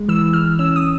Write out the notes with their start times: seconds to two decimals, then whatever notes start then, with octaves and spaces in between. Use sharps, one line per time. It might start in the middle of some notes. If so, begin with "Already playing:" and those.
Already playing: G#3
0.08 E3 E6
0.33 E3 F6
0.59 C#4 E6
0.76 D#6